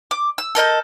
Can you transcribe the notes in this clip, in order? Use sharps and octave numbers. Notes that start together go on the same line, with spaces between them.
D6
E6
A4 A#4 D#5 G6